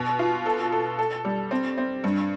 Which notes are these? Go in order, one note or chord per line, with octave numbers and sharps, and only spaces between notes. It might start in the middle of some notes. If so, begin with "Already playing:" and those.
Already playing: B2
F4
A4
A4
A4
G3
C4
C4
G2